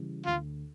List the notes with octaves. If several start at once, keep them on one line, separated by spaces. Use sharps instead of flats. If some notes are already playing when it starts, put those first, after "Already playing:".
Already playing: C#3 E3 G3
D2 F4